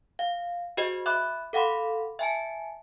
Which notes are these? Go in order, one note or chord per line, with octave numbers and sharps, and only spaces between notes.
F5
F#4 G#4 C5 D#5
E5 B5 D6 F#6
A4 F5 F#5 B5 C6
E5 G#5 A5